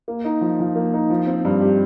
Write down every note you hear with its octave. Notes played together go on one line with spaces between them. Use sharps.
A#3
D#4
F3
F3
A#3
D#4
F3
C4
G2
G4